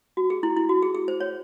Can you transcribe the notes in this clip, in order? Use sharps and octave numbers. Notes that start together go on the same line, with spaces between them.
F#4
G#4
E4
E4
F#4
G#4
G#4
C5
C#5